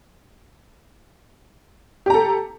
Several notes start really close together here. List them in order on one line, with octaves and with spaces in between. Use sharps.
G4 A#5 A4